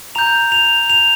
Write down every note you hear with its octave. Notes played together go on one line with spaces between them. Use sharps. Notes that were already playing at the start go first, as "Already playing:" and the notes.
A#5 G6 F7
F7
F7